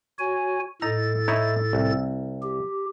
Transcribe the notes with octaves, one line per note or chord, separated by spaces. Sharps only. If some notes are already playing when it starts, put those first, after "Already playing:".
F#4 C#5 G#5
A2 D#4 A4 A#5 A6
D#4 E4 C#5
C2
G4